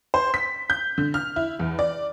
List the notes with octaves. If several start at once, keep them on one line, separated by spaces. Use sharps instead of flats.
C5
B6
G6
D3
F6
E4
E2
D5